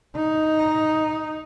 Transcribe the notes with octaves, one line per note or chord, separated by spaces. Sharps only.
D#4